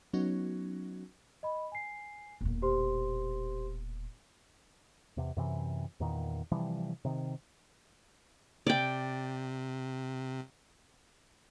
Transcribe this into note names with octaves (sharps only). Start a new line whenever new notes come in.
F#3 B3 C#4 D#4 F#4
D#5 B5
G#5 C7
E1 A#2
G4 C5 C6
E2 C3
F#2 C3 E3
E2 A#2 D#3
C3 E3 F3 G3
C3 D#3
C3 D5 G5